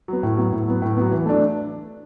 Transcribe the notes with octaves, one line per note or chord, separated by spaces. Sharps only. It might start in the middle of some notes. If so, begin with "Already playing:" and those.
F#3 B3
A2
F#3 B3
A2
F#3 B3
A2
F#3 B3
E3
A3 D4